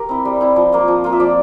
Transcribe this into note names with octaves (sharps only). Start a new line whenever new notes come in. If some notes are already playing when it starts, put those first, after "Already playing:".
Already playing: G4 A#4
C4 E4
G3
C4 E4
F3
A#3 F4
F3
A#3 F4
E5
F3 D5